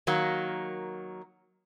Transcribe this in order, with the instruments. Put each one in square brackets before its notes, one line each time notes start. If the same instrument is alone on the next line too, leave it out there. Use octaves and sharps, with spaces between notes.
[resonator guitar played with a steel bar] D#3 F#3 A#3